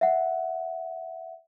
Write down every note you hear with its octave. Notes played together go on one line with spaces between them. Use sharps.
E5 F#5